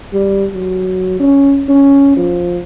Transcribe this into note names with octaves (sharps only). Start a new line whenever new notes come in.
G3
F#3
C#4
C#4
F3